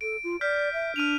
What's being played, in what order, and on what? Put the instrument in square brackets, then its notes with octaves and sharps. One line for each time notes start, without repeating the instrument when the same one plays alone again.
[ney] A4 [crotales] D7
[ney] F4
[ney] D5 [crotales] F6 G6 B6
[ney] E5
[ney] D4 [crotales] F6 D#7 F7